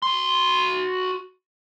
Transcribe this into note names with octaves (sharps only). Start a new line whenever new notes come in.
F#4 C6